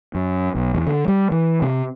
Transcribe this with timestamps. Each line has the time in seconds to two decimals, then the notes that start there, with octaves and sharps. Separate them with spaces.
0.15 F#2
0.55 B1
0.75 E2
0.87 D3
1.08 G3
1.32 E3
1.62 C3